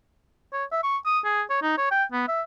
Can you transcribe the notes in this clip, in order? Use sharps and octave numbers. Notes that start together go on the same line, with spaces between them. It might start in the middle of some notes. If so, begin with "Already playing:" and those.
C#5
E5
C#6
D#6
G#4
C#5
D#4
C#5
G5
B3
E5